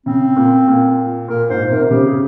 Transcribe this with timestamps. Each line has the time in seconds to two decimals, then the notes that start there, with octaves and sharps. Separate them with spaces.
0.06 C#3 C4
0.37 A#2
0.68 A#2
1.29 A#2 A#4
1.50 G#2 C5
1.70 C3 A#4
1.90 C#3 G4
2.05 G#4